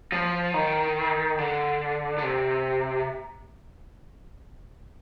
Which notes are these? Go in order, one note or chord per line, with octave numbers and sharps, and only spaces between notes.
F3
D#3
D3
D3
C3